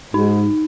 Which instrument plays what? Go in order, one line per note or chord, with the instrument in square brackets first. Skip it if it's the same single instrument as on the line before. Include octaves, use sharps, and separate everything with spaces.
[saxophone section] G#2 [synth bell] D#4